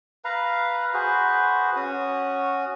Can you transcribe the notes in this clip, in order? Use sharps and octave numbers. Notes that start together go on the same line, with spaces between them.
B4 F5 A#5
F#4 G#4 B4 C5
C#4 F#4 D#6